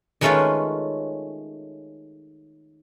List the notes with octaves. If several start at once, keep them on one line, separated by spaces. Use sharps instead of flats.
D#3 G#3 A3 C#4 F4 B4